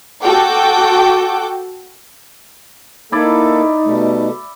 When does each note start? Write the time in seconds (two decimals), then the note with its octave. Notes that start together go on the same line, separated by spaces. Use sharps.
0.23 F#4 A4 G5 D6
3.12 A#3 D#4 E4 A4 D5
3.85 B2 G3 A3